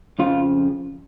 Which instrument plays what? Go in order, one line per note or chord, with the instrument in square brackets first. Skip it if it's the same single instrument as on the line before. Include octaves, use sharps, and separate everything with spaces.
[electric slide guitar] F2 C#3 F3 F4